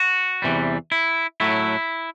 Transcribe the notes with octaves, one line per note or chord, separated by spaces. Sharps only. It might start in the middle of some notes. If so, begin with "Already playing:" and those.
Already playing: F#4
E2 C3 E3 G3
E4
A2 F#3 A3 E4